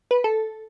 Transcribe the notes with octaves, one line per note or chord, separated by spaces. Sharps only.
B4
A4